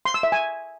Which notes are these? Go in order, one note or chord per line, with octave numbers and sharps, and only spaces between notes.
C6
E6
E5
G#5